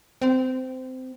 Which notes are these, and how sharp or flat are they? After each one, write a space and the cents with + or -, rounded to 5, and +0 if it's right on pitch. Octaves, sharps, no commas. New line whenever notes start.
C4 -20